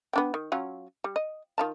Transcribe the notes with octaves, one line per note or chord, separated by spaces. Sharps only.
B3 D4 G5
D#3
F#3 C#4 F4
G3
D#5
D#3 F4 A5